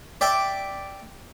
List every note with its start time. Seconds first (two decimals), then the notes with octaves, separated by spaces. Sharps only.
0.21 D5 E5 G5